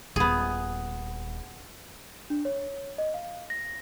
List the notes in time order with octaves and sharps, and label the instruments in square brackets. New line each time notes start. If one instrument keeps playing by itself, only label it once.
[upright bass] D#1 [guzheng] B3 G#4
[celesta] D4
C#5
D#5
F5
A#6